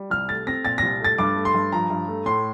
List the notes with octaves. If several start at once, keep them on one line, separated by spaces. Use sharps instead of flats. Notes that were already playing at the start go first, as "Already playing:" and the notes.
Already playing: G3
C2 F6
A3 A6
C4 A#6
A#2 A6
C2 A#6
A3 A6
G2 D6
A3
C6
G2
F3 A#5
G2
A3
A2 C6